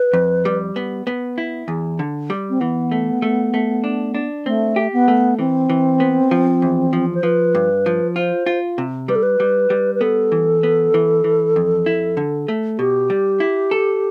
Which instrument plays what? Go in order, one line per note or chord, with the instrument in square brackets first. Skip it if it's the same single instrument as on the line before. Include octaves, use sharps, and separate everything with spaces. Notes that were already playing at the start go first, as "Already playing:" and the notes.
Already playing: [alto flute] B4
[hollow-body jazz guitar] F2
G3
B3
B3
E4
E2
D3
G3
[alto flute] C4
[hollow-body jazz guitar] E3 [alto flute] B3
[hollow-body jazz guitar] A3
A3
A3
D4
D4
[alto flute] A3 [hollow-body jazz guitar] C4
[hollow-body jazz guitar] G4
[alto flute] B3
[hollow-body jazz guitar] A3
[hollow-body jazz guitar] E3 [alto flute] C4
[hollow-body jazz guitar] E3
B3
F3
E2
F3
[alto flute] C5
[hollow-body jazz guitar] F3 [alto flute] B4
[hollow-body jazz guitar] G2
F3
[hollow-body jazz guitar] F4 [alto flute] C5
[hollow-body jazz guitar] F4
C3
[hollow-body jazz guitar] G3 [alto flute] B4
[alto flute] A4
B4
[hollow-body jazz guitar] G3
G3
[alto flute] B4
[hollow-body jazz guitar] B3 [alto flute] A4
[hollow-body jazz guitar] E3
B3
E3
E3
F2
E4
D3
A3
[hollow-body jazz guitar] B2 [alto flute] G4
[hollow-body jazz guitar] G3
E4
A4